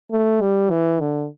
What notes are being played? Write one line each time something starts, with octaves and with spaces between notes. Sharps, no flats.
A3
G3
E3
D3